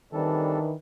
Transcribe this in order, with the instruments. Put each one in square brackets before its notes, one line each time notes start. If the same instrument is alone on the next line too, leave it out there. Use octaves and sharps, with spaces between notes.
[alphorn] D#3 [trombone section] E3 D4 B4 [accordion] G3 C4 A4